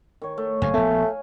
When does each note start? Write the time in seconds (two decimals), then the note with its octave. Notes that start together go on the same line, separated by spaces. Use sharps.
0.22 D#3 C#5
0.38 A3
0.62 F#1 G2 C#5 F5 G#5
0.74 A#1 A3 B3